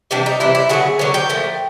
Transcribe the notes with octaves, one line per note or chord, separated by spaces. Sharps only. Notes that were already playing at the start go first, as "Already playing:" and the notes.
C3 E3 G3 D4
D#4
C3 E3 G3 E4
E4
D3 F#3 B3 G#4
D3 F#3 B3 C#5
G5
A#2 F3 A3